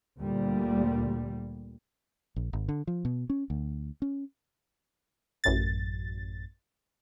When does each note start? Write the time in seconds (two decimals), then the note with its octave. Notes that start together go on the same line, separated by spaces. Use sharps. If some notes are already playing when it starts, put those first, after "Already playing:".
0.19 D2 A#2 G3
2.36 A#1
2.53 G#1
2.69 D3
2.87 F3
3.05 B2
3.30 C#4
3.50 D2
4.02 C#4
5.44 A1 F#2 A6